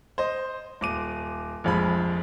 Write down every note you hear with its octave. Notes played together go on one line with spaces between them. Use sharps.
C5 D#5
D#1 D6 D#7
F1 A#1 F2 G#3 B5